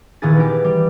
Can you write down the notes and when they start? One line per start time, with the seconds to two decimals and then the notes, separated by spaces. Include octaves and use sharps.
0.22 D#1 D#3 B3 E4 G#4 A6
0.36 E3 D#4 G4
0.64 G3